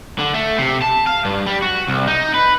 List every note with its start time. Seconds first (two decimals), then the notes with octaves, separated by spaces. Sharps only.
0.19 D3
0.34 A3
0.58 C3
0.82 A5
1.07 F5
1.25 G2
1.47 G3
1.62 F#4
1.88 C2
2.07 D#4
2.34 B4